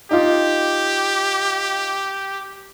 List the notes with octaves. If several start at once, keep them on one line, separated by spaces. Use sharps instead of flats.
D#4 F4 G4